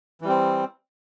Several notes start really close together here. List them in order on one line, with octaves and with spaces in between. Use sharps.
E3 G3 C4